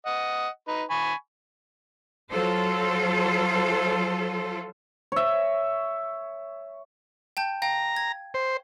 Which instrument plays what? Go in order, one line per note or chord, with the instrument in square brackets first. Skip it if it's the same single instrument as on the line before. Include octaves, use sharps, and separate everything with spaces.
[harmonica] D#5 F#5
D#4 B4
G#5 B5 C#6
[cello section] F#3 F4 A4 C5
[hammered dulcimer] C#5 E5
[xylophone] G5 A5 G6
[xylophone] F5 G5 [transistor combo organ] A#5
[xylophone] G#6
[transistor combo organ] C5